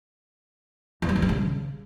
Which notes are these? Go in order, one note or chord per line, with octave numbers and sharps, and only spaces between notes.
E2
G3
D#3
G3
C#3